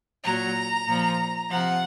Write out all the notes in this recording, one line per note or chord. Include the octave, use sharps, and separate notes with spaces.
A#2 F#3 A#5
A#2 F3
C3 F3 F#5